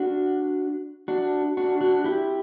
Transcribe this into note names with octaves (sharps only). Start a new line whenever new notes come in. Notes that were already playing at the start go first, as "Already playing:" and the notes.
Already playing: D4 F#4
D4 F#4
D4 F#4
D4 F#4
E4 G4